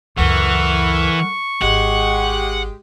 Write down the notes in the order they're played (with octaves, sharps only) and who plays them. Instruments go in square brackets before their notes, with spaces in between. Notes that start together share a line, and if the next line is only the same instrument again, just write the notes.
[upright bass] C#2 F#2 [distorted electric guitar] E3 [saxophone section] A4 A#4 F#5 [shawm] C#6
[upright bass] G#1 [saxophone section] G#3 G4 [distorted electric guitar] F#5